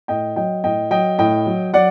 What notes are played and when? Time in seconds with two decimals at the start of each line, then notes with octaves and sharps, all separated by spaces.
0.08 A2 D#5 G5
0.36 F#3 D#5 G5
0.64 A2 D#5 G5
0.90 F#3 D#5 G5
1.18 A2 D#5 G5
1.46 F#3
1.73 F#3 D5 F#5